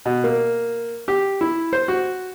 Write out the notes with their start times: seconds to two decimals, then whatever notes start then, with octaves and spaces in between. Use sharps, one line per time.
0.06 B2
0.24 A#3
1.08 G4
1.41 E4
1.73 C5
1.88 F#4